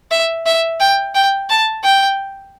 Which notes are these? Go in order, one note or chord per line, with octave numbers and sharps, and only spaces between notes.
E5
E5
G5
G5
A5
G5